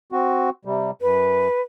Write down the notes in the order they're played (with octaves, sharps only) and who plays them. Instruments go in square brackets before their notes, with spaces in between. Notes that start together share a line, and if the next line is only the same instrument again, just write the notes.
[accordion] C4 F#4
C3 G3
[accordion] F#2 [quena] B4